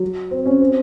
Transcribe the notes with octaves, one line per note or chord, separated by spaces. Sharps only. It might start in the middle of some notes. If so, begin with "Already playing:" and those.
Already playing: F#3
C4
C#4
C4